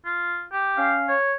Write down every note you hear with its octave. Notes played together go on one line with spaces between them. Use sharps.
F4
G4
C#4 F5
C#5